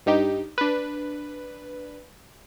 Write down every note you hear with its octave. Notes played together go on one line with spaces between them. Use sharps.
G2 D#4 G4
D4 B4